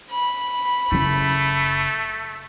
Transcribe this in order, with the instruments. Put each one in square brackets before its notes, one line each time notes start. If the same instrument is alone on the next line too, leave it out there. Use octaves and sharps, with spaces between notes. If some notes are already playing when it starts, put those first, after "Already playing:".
[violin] B5
[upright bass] F#1 E4 [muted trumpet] A3